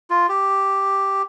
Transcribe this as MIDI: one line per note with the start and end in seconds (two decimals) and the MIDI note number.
0.10 0.27 65
0.29 1.22 67